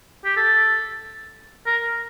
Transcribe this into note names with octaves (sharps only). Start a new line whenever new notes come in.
G4
A4
A#4